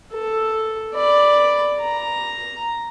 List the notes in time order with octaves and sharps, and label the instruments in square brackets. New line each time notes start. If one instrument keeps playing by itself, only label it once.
[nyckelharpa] A4
D5 B5
A#5